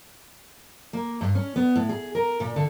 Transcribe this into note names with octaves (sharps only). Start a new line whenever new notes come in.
A#3
G2
C#4
B3
A2
G#4
A#4
A#2
D3